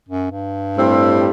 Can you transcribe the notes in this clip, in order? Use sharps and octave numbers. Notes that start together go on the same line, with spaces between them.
F#2
G2
A2 G3 C4